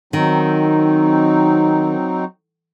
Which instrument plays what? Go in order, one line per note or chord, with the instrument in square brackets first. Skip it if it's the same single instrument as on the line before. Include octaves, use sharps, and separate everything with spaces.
[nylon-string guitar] D#3 [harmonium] F#3 C4 D#4